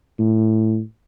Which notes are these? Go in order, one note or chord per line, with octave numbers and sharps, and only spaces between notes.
A2